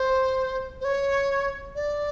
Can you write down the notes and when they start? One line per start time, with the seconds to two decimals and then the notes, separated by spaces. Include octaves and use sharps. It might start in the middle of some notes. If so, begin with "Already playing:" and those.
Already playing: C5
0.81 C5
0.85 C#5
1.75 D5